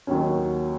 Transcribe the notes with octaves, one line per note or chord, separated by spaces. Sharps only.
D#2 D#3 F#3 C#4